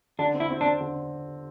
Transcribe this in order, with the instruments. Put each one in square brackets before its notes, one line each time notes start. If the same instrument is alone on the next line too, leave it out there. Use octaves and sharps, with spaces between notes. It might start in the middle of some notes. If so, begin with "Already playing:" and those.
[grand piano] D3 [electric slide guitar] D4
[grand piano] C4
[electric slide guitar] E4
[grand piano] C4
[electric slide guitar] D4
[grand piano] C4
D3